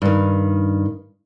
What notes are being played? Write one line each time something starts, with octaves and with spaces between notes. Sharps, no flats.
G2 D#3